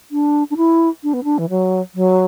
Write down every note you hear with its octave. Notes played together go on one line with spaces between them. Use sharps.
D4
D4
E4
D4
B3
D4
E3
F#3
F#3